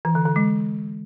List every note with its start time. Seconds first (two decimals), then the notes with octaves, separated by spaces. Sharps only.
0.05 E3
0.15 D3
0.26 D3
0.36 G#3